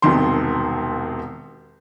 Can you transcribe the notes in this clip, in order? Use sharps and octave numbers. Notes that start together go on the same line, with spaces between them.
E1 C2 D#3 C6